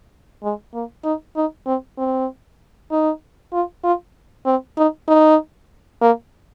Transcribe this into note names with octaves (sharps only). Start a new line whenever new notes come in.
G#3
A#3
D#4
D#4
C4
C4
D#4
F4
F4
C4
D#4
D#4
A#3